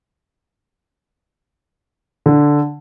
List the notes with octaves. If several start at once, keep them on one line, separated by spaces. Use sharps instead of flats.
D3